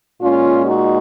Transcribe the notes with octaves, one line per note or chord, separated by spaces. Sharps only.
A#2 G#3 C#4 F4
D#4 F#4